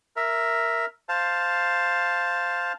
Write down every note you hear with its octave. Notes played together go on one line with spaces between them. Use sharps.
A#4 E5
C5 F5 A5